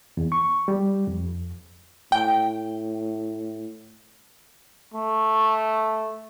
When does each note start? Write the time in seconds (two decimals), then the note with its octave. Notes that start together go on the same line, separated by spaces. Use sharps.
0.17 E2
0.32 C#6
0.68 G3
1.07 F2
2.12 A2 G5
4.94 A3